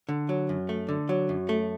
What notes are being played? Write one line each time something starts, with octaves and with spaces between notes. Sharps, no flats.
D3
F#3
F#2
A3
D3
F#3
F#2
A3